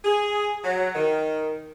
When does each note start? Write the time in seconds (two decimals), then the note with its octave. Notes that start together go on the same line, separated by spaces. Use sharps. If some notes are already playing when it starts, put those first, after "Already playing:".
0.04 G#4
0.62 F#3
0.93 D#3